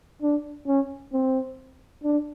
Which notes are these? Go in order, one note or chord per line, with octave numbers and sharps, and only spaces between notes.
D4
C#4
C4
D4